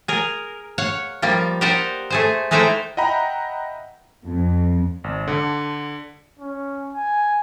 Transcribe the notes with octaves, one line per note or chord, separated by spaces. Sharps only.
G#4 A#4
C#5 F5 F#5
F3 G3 A#3
G4 A#4 C5 D5 D#5 F#5
A3 G#4 C5
G#3 A3 D#4 E4 C5 G5
D#5 E5 F#5 G5 A#5 B5
F2
G#1
D3
C#4
G#5